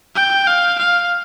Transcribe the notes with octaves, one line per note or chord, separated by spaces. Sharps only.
G5
F5
F5